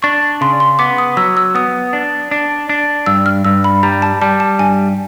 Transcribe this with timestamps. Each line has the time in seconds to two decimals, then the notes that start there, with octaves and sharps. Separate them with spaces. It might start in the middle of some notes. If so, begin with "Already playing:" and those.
0.02 D4 C#6
0.41 C#3 C6
0.60 C6
0.79 B3 D6
0.98 D#6
1.17 F#3 E6
1.37 E6
1.55 B3 D#6
1.93 D4
2.31 D4
2.69 D4
3.06 G2 E6
3.26 F6
3.44 G2 E6
3.64 B5
3.83 G3 A#5
4.02 A5
4.22 G3 A5
4.40 A5
4.59 G2 G#5